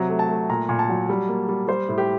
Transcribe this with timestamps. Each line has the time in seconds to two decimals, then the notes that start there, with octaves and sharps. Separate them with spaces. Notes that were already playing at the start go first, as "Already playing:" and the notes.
Already playing: C3 F#3 A#5
0.09 A3
0.19 A5
0.29 A3
0.49 A#2 A#5
0.69 A#2
0.79 A5
0.89 F#3
1.09 G3
1.28 A#3
1.49 G3
1.68 G3 C5
1.89 A2
1.98 G4